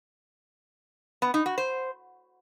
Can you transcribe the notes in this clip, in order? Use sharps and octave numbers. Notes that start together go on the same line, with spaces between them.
B3
D#4
F#4
C5